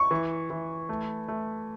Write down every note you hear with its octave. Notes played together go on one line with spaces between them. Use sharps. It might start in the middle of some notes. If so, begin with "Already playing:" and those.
Already playing: C#6
E3
E3
A3
A3